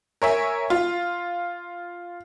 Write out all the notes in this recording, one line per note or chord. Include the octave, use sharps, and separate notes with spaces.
A#4 C#5 E5 G#5
F4